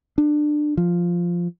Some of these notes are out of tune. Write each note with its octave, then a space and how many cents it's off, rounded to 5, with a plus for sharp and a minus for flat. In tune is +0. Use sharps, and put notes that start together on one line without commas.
D4 +20
F3 -5